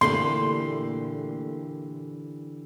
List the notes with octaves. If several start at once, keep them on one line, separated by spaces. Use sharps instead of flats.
A#2 D3 E3 A3 G4 C6